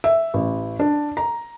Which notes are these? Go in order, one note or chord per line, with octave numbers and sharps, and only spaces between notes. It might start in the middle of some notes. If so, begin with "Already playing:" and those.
E5
A1
D4
A#5